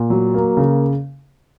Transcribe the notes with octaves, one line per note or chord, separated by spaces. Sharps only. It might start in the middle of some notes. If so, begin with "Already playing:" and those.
Already playing: A#2
F#3
A#3
C#3